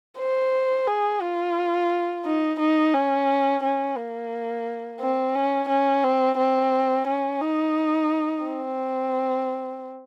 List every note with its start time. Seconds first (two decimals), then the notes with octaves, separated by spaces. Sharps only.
0.19 C5
0.88 G#4
1.22 F4
2.25 D#4
2.59 D#4
2.94 C#4
3.63 C#4
3.97 A#3
5.00 C4
5.35 C#4
5.69 C#4
6.04 C4
6.38 C4
7.07 C#4
7.41 D#4
8.44 C4